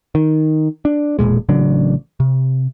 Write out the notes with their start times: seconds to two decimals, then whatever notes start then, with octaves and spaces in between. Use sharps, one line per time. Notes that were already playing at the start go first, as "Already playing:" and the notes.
0.15 D#3
0.85 D4
1.19 E1 C2 A#2 G#3
1.49 A1 C#3 F#3 D4
2.20 C3